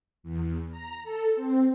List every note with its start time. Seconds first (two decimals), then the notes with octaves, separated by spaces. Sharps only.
0.23 E2
0.71 A#5
1.03 A4
1.36 C4